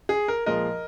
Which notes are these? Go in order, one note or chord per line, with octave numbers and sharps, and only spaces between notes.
G#4
A#4
A#2 F3 G#3 A#4 D#5